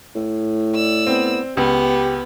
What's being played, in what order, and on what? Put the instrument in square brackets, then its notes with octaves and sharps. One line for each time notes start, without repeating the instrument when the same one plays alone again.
[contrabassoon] A2
[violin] D5 E6
[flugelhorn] B3 [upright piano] C4
[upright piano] C#2 [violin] B3 [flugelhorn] G4